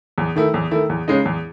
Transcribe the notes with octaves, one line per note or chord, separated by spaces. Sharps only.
E2
D#3 A3 E4
E2
D#3 A3 E4
E2
C#3 G#3 D#4
E2